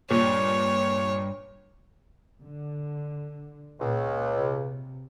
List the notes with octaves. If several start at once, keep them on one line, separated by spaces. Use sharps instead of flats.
C#2 G2 A#2 C#5
D3
C#2 A#2
C3